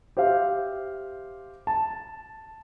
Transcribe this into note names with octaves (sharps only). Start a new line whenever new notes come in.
G4 C5 E5 F5
A5